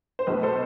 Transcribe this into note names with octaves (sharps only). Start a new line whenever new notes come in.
C5
B1 B2 A3 B4
A4 C5